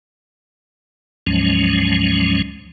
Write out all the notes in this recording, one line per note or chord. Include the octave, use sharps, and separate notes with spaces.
D2 G#2 F3 F#3 G#3 C#4